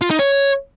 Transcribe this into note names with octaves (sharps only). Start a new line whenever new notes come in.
F4
D#4
C#5